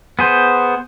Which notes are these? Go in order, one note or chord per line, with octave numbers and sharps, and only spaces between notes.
B3 G#4 C5